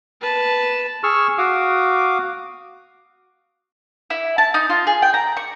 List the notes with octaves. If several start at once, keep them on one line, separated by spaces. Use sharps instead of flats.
B4 A5
G#4 C#6 E6 F6
F#4 F5 D6 D#6
E4
A5
D#4
F4
G#4
G5
A#5
C#6